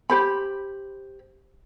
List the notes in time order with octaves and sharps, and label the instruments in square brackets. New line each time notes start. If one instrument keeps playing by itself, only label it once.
[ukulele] G4 C5 B5